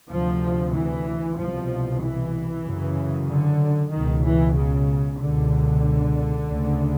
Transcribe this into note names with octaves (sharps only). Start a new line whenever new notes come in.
D2 C3 F3
E3
C2 B2 F3
E3
F#2 C#3
D3
C#2 B2 D#3
E3
C#3
C#2 B2 D3
D2 C#3